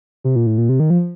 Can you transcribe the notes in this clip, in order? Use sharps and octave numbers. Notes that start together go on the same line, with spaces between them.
C3
A#2
A2
A#2
C3
D#3
F3